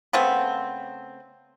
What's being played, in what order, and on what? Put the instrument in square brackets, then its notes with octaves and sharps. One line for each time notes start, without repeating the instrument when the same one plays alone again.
[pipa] C#3 A3 B3 C4